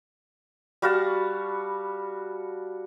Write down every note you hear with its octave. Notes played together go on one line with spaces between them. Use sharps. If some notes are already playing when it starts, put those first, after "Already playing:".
G3 F#4 F5 A5